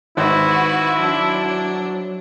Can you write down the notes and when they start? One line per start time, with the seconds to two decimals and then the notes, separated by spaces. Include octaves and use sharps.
0.17 G#1 E4 F#4 B4
1.00 F#3 D4